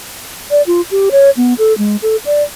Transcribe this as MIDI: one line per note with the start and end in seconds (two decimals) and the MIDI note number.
0.51 0.62 74
0.67 0.81 65
0.91 1.09 67
1.11 1.30 73
1.37 1.54 59
1.58 1.76 69
1.78 1.96 56
2.02 2.16 69
2.26 2.43 74